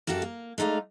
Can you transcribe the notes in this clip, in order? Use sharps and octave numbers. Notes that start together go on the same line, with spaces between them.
F#2 A#3 F#4 G4 A4
A#3
G#3 A3 D#4 D5 F5